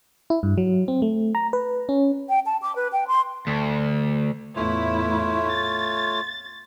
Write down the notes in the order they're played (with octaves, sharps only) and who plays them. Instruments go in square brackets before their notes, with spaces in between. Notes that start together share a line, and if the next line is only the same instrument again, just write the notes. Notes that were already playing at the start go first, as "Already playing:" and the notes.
[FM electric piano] E4
G2
F#3
C4
A3
A#5
B4
C#4
[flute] G5
A5
D6
B4
G5
C6
[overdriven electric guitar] D2
[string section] E2 A2 E4 [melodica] A3 F4 C#5
[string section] A6